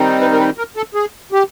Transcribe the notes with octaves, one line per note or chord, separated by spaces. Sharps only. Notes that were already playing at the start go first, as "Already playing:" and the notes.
Already playing: D#3 G3 C4 D#4
B4
A#4
B4
A#4
A4
G#4
G4